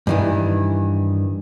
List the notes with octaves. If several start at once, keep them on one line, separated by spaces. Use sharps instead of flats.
G2 D#3 E3